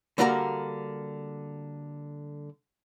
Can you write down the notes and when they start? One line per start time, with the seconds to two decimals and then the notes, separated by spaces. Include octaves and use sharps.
0.18 D3 G3 A#3 F#4 A#4 A#5